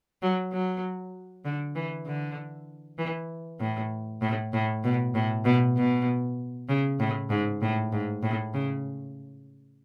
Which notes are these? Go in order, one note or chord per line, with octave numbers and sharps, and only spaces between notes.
F#3
F#3
D3
E3
D3
E3
A2
A2
A2
B2
A2
B2
B2
C#3
A2
G#2
A2
G#2
A2
C#3